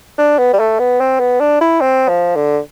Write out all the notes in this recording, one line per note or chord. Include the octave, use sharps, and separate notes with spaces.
D4
B3
G3
A3
B3
C4
B3
D4
E4
C4
F3
D3